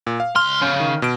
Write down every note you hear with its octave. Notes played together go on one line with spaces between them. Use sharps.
A#2
F5
C#2 C6 F6
C#3
D#3
B2 D7